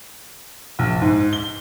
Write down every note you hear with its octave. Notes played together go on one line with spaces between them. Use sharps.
A#1
G#2
G7